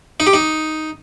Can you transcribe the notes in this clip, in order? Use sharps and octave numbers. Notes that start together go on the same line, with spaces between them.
D#4
G4
D#4